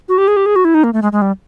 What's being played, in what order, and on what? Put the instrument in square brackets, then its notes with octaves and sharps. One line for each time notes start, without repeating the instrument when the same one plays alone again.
[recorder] F#4
G4
G#4
G4
G#4
F#4
E4
D#4
A#3
A3
G#3
G#3
G3